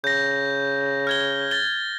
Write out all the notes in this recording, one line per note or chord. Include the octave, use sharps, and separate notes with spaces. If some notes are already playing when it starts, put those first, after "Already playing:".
C#3 G6 A#6
F6 G#6 G7
A6 G7